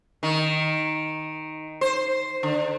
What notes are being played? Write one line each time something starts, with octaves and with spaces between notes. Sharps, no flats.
D#3
C5
D3